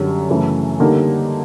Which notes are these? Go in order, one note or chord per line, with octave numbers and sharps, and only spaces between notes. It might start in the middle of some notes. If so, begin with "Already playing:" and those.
Already playing: F#2 D3 G3
F#2 C#3 E3 A3
D3 G3 A#3 D#4